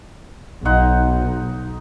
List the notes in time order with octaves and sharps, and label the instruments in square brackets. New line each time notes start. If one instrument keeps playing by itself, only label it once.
[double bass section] B1 [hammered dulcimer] D#4 F#5 C6